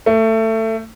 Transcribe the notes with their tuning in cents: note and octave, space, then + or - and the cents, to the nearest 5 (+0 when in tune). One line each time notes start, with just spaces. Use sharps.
A3 +20